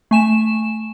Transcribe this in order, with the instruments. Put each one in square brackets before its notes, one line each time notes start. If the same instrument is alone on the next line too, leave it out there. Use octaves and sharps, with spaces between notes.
[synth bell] A3 G#5 E7